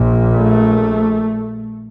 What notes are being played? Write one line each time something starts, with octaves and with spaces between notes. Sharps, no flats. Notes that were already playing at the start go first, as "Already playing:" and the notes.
Already playing: A#1 A#2
A3